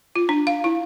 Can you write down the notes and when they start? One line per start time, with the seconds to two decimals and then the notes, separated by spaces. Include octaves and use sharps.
0.16 F4
0.29 D4
0.47 F5
0.64 E4